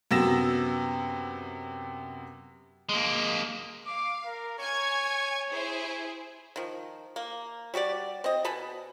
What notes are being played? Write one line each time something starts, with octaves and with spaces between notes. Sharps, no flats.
F#2 C3 B3 E6 A#6 E7
G#3 A#3
F5 D6
A#4
C#5 G#5 C#6 G#6
E4 G#4 C5
D#3 F3
A#3
G3 F#4 G4 D5
C4 D#5
B2 G#5 A5 B5